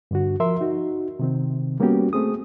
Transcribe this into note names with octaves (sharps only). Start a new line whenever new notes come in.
G2 D3 F#4
F3 A#4 E5 C6
D#4 F#4
C3 D#3 C4
G3 A#3 B3 C#4 F#4 G4
A3 C4 G#4 D#6